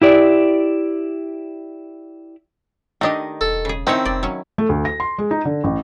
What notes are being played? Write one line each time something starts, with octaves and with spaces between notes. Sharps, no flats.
E4 G4 D5
D#3 A3 D4 G4 D#5
E1 A4
C#3 G#4
D#3 C4 C#4 D#4 E4 C#5
F1 D5
F#3 C#4
A3
D2
A#6
C6
G#3
D#4
D3
A1